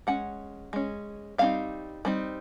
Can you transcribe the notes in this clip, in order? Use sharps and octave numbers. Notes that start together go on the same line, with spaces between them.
G#3 C#4 F#5
G#3 C#4
G3 C4 D#4 F5
G3 C4 D#4